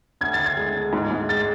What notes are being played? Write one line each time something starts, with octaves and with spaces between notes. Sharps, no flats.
D2 G#6
A6
D2
G#6
G#3
D2
G#2
G#2
G#3 A6